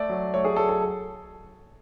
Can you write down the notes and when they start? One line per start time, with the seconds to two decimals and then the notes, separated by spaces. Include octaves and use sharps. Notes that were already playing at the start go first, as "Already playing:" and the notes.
Already playing: A3 D5
0.09 F#3
0.33 A3 C#5
0.45 G#4
0.56 F#3 A4
0.69 A4